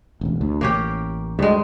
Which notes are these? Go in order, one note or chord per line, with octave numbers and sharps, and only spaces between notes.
E1 A1
D2
A1 A#3 C#4 G4
D2 G2 G3 G#3